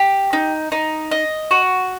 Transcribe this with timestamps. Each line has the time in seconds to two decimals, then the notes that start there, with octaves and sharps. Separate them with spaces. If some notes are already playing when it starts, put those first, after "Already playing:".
Already playing: G4
0.33 D#4
0.72 D#4
1.11 D#5
1.51 F#4